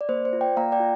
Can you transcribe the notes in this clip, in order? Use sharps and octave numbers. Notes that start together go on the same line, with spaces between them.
D5
A#3 C5
C5
F4
D5 G5
A#3 F5 A#5
D5 G5
F4